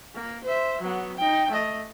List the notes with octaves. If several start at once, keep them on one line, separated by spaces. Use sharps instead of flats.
A#3
C5 E5
F#3 B3
D#4 G5
A3 D#5